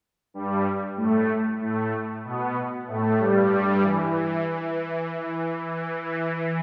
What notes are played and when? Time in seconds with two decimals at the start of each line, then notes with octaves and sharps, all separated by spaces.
0.34 G2 G3
0.97 A2 A3
1.61 A2 A3
2.25 B2 B3
2.87 A2 A3
3.19 G2 G3
3.82 E3
4.45 E3
5.09 E3
5.73 E3
6.04 E3